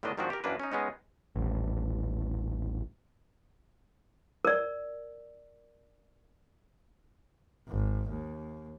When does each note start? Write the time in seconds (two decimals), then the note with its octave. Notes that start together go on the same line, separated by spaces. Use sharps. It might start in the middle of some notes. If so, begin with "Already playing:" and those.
0.03 A2 D3 D#3 B3 D4 D#5
0.17 G#2 D#3 F3 C4 D4 F#4
0.30 G4 A#4
0.44 F#2 E3 A#3 D4 B4
0.60 C#4 D#4
0.72 G#3 B3 C#4 D#4
1.36 D#1 A1
4.45 A#4 D5
7.68 G#1
8.10 D#2